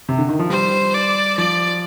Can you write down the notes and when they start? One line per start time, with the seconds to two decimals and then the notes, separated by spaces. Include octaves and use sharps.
0.09 C3
0.18 D3
0.29 D#3
0.39 F3
0.50 G3 C5
0.94 D5
1.38 F3 D5